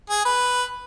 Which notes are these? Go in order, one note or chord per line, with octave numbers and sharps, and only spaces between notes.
G#4
B4